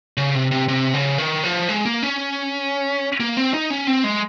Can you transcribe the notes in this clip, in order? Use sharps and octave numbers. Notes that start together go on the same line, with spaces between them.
C#3
C3
C3
C3
C#3
D#3
F3
G#3
A#3
C#4
A#3
C4
D#4
C#4
C4
G#3